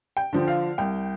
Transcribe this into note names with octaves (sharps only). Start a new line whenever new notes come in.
G5
D3 F3
F5
C2 G5